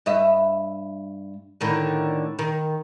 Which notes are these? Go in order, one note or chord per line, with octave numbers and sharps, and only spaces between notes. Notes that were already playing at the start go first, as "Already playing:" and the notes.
G2 D#5 E5
A2 D3 D#3
D#3